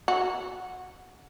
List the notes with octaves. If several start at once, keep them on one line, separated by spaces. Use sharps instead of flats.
F#4